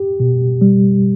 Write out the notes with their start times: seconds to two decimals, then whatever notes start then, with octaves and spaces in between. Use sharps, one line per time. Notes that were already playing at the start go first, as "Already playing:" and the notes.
Already playing: G4
0.20 B2
0.61 G3